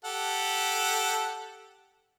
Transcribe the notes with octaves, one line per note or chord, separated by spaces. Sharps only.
G4 A4 F#5